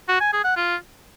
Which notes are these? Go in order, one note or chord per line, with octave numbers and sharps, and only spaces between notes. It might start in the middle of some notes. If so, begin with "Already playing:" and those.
F#4
G#5
G#4
F#5
F4